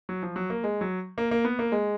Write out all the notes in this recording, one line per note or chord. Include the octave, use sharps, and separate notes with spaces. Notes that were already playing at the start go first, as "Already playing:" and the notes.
F#3
F3
F#3
A#3
G#3
F#3
A#3
A#3
B3
A#3
G#3